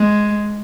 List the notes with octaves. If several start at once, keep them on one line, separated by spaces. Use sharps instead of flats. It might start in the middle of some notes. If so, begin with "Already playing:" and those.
Already playing: G#3